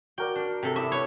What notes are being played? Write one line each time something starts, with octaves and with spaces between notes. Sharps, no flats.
F#4 A#4 D5 G5
D4
C3 A4
E4 E5 D6 D#6
G4 B4 C#5